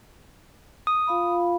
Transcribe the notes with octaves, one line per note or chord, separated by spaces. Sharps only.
D#6
F4 F5 B5